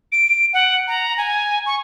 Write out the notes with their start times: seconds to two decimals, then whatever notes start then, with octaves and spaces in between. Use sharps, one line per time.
0.12 D7
0.53 F#5
0.88 A#5
1.18 G#5
1.66 C#6